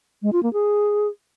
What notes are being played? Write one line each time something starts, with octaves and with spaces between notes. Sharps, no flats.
G#3
F4
A#3
G#4